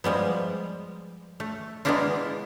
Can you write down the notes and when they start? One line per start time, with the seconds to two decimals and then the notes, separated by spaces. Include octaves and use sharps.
0.04 F3 G3 G#3 B3
1.40 A3
1.85 G#3 A#3 B3 D4 E4 F4